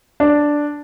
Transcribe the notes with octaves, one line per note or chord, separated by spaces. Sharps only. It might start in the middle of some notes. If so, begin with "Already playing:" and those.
D4